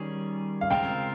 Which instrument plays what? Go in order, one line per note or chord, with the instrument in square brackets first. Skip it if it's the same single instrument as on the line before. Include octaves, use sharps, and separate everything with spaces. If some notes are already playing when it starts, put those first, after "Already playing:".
Already playing: [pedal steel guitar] D#3 G3 C#4 G#4
[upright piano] F5
[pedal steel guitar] C#3 G#3 C4 F4 A#4 [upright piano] G5